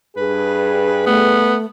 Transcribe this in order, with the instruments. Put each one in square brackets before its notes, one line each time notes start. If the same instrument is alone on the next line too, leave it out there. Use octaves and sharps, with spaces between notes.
[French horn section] G2 G#4 [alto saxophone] B4
[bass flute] A3 [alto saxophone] B3